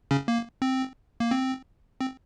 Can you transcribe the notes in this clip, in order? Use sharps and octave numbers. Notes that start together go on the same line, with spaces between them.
C#3 C#4
A#3
C4
A#3
C4
C4